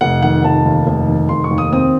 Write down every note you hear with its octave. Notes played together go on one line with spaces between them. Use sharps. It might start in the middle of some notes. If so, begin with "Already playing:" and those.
F1 F#5
D#3 F#5
F1 A5
D#2
F1
D#3
F1 C6
C#6
D#2
D#6
C4 D#6